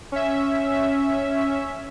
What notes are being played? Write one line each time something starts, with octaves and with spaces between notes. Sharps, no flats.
C#4 E5